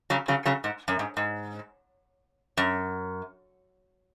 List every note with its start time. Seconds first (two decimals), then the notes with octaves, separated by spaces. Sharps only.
0.10 C#3 F#3
0.28 C#3 F#3
0.45 C#3 F#3
0.64 G#2
0.88 F#2
0.99 G#2
1.17 G#2
2.57 F#2